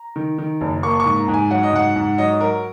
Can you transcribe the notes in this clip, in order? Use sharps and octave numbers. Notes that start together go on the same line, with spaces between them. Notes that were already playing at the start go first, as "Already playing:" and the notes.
Already playing: A#5
D#3
D#3
F#1
A#3 C#6
C#6
G#2
A#5
G#2
G#5
F#3 F#5
D#5
G#2 F#5
G#2
F#3 D#5
F#3 A#4